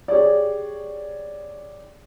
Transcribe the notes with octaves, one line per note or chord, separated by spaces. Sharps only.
G4 G#4 C#5 D5